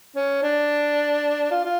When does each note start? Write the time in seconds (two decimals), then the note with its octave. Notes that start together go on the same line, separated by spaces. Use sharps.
0.16 C#4
0.43 D4
1.51 F4
1.65 F4